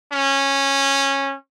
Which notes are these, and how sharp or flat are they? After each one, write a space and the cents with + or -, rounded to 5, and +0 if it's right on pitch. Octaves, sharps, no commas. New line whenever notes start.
C#4 -15